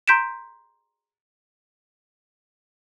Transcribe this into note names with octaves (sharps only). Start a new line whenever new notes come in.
A#5 C6 G6 B6 D7 E7